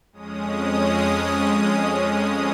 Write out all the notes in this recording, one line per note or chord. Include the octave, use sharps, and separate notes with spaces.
F2 G#3 C#4 D#6